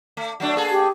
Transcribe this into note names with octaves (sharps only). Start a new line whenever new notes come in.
A3
F#3 A3 D4
A#3 G#4 A4
G4